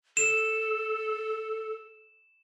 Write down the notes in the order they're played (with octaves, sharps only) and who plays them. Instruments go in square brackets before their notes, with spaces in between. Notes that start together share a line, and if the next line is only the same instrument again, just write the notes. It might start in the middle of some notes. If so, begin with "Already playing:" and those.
[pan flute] A4 [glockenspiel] E7